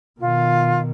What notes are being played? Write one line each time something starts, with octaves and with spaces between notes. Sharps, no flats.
B2 D#3 F4